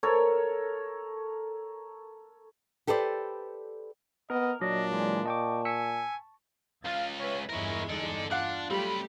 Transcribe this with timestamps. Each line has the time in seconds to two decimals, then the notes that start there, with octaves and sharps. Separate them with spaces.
0.03 A4 A#4 C#5
2.87 G4 A4 B4 C5 D5
4.30 B3 A#4 D#5
4.61 A#2 F#3 D4 D#5
4.91 E3 G#3
5.26 D#5 G5 A5 C#6 D6
5.65 G#5 E6 B6 C#7
6.85 C#2 F4 F5 A6
7.19 B4 C#5 E5 G#5
7.49 G1 E2 G#3 E4 A#4 C#5
7.89 D#4 A4 D5
8.31 D4 F4 F5 F#5
8.71 F#3 G3 A3 C4 G4 B5